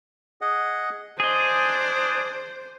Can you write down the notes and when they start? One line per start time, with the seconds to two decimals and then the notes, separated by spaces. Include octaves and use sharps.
0.41 G#4 D#5 F#5
1.20 D4 G#4 C5 D#5 G#5